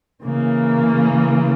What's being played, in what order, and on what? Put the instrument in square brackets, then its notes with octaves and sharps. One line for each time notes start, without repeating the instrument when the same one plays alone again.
[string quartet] C#3 E3 A#3